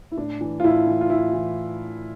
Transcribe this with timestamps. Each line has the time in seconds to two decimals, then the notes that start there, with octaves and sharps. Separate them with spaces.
0.12 E4
0.17 A2 D4
0.41 E3
0.60 F4
0.64 A2 E4
0.87 E3
1.01 F4
1.09 E3 E4
1.33 E3